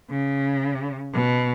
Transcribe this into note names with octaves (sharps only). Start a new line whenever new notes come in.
C#3
B2